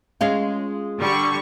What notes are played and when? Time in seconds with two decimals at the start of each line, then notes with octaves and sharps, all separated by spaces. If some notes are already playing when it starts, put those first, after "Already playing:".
0.21 G#3 C#4 F4
0.98 D3 G3 C#6